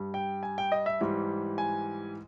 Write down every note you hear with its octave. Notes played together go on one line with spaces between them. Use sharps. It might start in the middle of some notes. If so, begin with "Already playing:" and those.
Already playing: G2 G3
G5
G#5
G5
D#5
E5
G#2 E3 G3
G#5